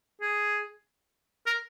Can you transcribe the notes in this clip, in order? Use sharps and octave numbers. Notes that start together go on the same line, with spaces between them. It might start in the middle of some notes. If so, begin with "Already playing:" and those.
G#4
A#4